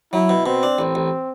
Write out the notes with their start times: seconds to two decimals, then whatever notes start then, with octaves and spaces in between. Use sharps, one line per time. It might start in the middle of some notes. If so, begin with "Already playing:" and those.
0.13 F#3 E4
0.29 B2
0.46 B2 C4
0.63 D4
0.78 A1
0.95 A1